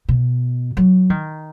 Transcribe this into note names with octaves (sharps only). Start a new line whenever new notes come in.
B2
F#3
D#3